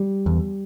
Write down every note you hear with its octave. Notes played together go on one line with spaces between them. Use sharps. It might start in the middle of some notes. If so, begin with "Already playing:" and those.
Already playing: G3
E2